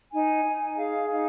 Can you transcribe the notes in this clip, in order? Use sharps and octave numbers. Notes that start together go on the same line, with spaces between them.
D#4 G#5
D#4
G#4 F5
D#4 F5